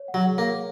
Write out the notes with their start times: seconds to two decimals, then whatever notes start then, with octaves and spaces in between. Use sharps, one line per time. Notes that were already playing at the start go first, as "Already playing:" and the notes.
Already playing: C#5
0.08 F#5
0.14 F#3
0.26 G#4
0.38 A#3
0.44 C#5